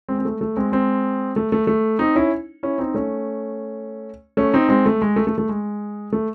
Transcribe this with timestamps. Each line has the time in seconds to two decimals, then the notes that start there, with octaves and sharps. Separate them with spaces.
0.09 G#3 C4
0.19 C4
0.25 A3
0.41 A3
0.57 G#3 C4
0.72 G#3 C4
1.36 A3
1.52 A3
1.67 A3
1.99 C4 D#4
2.16 C#4 E4
2.63 C#4 E4
2.78 C4 D#4
2.94 A3 C#4
4.37 A3 C#4
4.53 C4 D#4
4.69 G#3 C4
4.86 A3
5.02 G#3
5.16 A3
5.27 A3
5.38 A3
5.49 G#3
6.13 A3